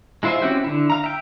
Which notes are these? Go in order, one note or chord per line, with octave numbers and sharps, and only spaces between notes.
G#3 E4 F4 C5 E5
C4 C#4 E4 F#4 G4
D3 E4
F5 A#5
E5 G5